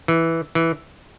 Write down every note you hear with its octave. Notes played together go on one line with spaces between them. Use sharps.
E3
E3